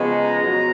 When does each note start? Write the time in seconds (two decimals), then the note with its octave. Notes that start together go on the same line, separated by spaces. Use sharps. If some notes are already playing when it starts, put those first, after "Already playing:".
Already playing: C#3 F3 G#3 B3
0.11 A#5
0.42 B2 F#3 B3